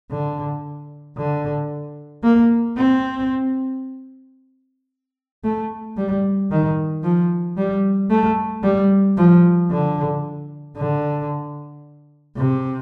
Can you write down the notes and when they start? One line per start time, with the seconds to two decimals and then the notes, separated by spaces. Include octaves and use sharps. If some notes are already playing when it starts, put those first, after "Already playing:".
0.11 D3
1.17 D3
2.23 A#3
2.77 C4
5.44 A3
5.97 G3
6.51 D#3
7.04 F3
7.57 G3
8.10 A3
8.63 G3
9.17 F3
9.70 D3
10.77 D3
12.37 C3